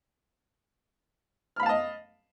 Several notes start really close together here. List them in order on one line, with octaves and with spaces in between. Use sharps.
F6 B5 F5 A5 D#5